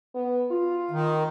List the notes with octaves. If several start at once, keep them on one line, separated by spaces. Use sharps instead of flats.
B3
F4
D#3